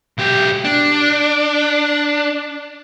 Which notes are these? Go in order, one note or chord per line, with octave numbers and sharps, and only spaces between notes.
B1 G4
D4